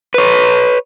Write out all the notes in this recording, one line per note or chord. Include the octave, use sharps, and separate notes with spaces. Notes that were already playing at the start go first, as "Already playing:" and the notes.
B4 C#5